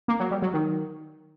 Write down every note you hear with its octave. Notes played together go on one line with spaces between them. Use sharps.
A#3
F#3
G3
F#3
D#3